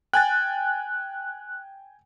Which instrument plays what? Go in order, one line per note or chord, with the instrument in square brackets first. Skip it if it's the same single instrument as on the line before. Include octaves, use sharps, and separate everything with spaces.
[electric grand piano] G5 G#5 A6 [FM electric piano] F#6